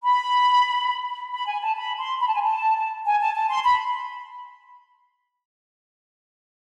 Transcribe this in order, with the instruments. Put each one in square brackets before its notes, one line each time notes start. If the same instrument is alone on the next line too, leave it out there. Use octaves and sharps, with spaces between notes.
[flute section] B5
B5
G#5
A5
B5
C6
B5
A5
G#5
A5
G#5
A5
A5
C6
B5